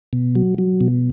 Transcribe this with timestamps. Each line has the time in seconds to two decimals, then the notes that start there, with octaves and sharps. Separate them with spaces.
0.13 B2
0.35 F#3
0.58 F#3
0.81 B2